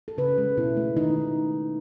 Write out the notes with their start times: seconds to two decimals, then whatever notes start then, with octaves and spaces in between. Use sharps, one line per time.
0.08 A4
0.18 C#3 B4
0.38 G#3
0.57 B2 E4
0.77 A3
0.97 D#3 D#4